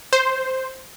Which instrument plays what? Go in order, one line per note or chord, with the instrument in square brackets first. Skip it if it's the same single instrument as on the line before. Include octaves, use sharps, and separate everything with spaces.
[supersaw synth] C5